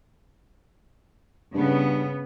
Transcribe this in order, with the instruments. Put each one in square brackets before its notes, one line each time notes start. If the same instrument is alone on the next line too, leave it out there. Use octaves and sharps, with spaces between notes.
[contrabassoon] G2 [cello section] C#3 B3